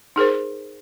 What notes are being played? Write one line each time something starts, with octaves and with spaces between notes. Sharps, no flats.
D#4 G#4 A#4 C5